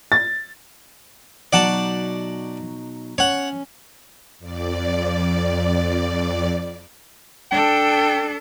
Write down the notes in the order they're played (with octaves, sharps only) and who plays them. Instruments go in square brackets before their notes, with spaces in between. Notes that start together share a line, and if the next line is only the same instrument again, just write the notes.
[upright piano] A6
[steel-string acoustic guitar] B2 F#3 D#4 [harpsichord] D5 F#5 A5
[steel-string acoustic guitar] C#4 [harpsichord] C#5 F#5
[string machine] F2 D5
[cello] D4 A4 [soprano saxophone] G5